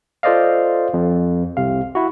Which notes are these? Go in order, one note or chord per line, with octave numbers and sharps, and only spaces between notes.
F4 A4 C5 D5 D#5 F5
F2
C2 C3 F5
E4 F#4